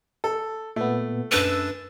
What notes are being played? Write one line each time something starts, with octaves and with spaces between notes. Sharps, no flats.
A4
A#2 A3 B3
F#2 D4 B4 E6 A6